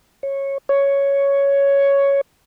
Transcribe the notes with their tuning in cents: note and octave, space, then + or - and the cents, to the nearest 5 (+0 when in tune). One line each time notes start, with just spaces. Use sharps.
C#5 -15
C#5 +5